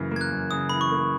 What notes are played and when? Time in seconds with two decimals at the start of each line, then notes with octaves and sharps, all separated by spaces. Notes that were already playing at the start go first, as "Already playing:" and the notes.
Already playing: F#2 C#3 E3 A#3
0.11 A#3 G#6
0.21 F#6
0.32 F#2
0.51 C#3 D#6
0.69 E3 B5
0.81 C#6
0.92 A#3